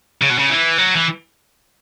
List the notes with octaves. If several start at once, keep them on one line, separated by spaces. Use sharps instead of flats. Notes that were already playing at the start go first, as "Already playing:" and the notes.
C#3
B2
C#3
E3
F#3
E3